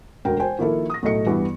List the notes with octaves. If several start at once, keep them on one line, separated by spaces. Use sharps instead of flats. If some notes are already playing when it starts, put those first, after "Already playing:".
E1 D2 A#4 G5
C5 G5 G#5
D#3 F3 A#3 E4 A4
D#6 A#6
B1 A2 A3 A4 D#5 C#7
G2 E3 G3 B3 E4